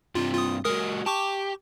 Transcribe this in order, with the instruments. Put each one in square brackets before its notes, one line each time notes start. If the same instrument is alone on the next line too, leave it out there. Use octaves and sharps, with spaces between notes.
[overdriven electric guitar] G2 C3 [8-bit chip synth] F4
[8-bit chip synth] F4 D#6
[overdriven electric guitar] F#3 G#3 [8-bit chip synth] A#4 D#6
[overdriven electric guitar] G4 [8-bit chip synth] A5 C#6 D6